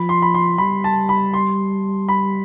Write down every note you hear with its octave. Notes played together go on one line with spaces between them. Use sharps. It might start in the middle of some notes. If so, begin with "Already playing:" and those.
Already playing: F3 B5
C6
B5
C6
G3 B5
A5
B5
C6
B5